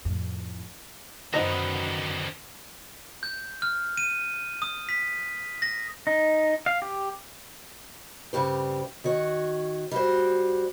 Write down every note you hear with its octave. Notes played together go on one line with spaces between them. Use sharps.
F2 A2
F#2 D3 D#3 F#3 B3 D#4 C5 A#5
G6
F6
D#7
D#6
B6
A#6
D#4
F5
G4
G2 C#3 G4 C5
D#3 F#4 C#5
G3 F#4 C5